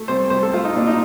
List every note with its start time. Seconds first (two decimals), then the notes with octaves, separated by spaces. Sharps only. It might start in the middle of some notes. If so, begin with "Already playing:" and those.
Already playing: A3
0.08 C2 C5
0.30 C2 C5
0.43 A4
0.53 A3 F4
0.65 D#4
0.76 A#2 D4
0.87 D#4